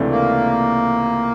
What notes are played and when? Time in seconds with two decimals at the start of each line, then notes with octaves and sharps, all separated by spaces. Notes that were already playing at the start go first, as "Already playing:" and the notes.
Already playing: C#2 C3 E3 A3 D4
0.10 A#3